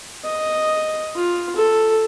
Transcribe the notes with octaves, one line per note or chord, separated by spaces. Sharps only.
D#5
F4
A4